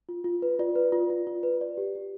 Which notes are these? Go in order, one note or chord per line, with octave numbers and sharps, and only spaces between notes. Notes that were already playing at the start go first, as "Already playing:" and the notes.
F4
F4
B4
F4 D5
B4
F4
F4
F4
B4
D5
G4
G4